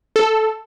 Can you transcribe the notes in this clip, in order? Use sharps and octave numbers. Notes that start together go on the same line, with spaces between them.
A4